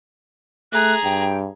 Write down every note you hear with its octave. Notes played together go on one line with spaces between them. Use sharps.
A3 G#4 A#5 F#6
G2 G5